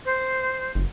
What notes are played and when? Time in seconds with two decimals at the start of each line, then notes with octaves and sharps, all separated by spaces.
0.05 C5
0.75 F#1